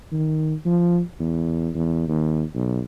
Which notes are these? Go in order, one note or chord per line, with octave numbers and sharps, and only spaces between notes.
D#3
F3
E2
E2
D#2
B1